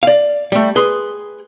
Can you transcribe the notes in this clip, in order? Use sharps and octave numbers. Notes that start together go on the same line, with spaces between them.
D5 F5
G3 A3
G#4 B4 C6